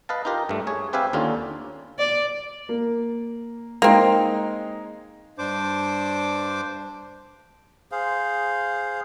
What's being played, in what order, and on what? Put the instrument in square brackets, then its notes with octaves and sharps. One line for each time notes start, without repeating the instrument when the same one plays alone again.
[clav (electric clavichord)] B4 D#5 F5 A5
D#4 F4 G4 A#4
G2 A3
G#4 C#5
C4 G4 B4 E5 F5 G#5
D#2 D3 C#4 F4
[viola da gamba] D5
[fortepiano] A#3
[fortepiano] G#3 D#4 [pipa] A#3 C4
[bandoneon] G2 D4 C5 D6
[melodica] G#4 C5 F5